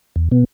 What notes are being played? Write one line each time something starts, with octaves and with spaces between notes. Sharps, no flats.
E2
B2 B3